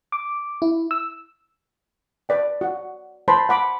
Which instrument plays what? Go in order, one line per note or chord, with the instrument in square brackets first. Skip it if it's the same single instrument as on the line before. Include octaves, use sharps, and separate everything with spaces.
[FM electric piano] D6
E4
E6
[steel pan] B4 D5 G5
F#4 F#5
B4 C5 A5 B5 C6
F#5 B5 D6